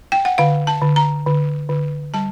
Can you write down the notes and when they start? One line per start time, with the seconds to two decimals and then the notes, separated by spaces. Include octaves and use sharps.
0.12 G5
0.25 F#5
0.38 D3 F5
0.67 A5
0.82 D3
0.96 A#5
1.26 D3
1.69 D3
2.14 G3 A5